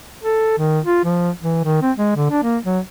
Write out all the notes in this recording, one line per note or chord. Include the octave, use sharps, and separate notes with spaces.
A4
D#3
F4
F3
E3
D#3
C4
G#3
D3
D4
A#3
F#3